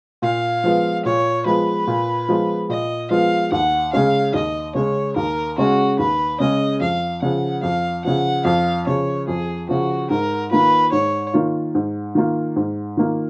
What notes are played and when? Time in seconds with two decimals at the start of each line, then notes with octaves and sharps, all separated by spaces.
0.22 A#2 F5
0.64 F3 G#3 B3 F4
1.05 A#2 C#5
1.46 F3 G#3 B3 F4 B4
1.87 A#2
2.29 F3 G#3 B3 F4
2.69 A#2 D#5
3.10 F3 G#3 B3 F4 F5
3.52 D#2 F#5
3.92 C#3 G#3 C#4 F5
4.34 D#2 D#5
4.75 C#3 G#3 C#4 C#5
5.16 D#2 A#4
5.58 C#3 G#3 C#4 F#4
5.99 D#2 B4
6.40 C#3 G#3 C#4 D#5
6.81 F2 F5
7.22 C#3 F3 F#5
7.63 F2 F5
8.05 C#3 F3 F#5
8.45 F2 F5
8.87 C#3 F3 C#5
9.28 F2 G#4
9.69 C#3 F3 F#4
10.10 G#2 A#4
10.51 D#3 A#3 F4 B4
10.92 G#2 C#5
11.33 D#3 A#3 F4
11.75 G#2
12.15 D#3 A#3 F4
12.56 G#2
12.97 D#3 A#3 F4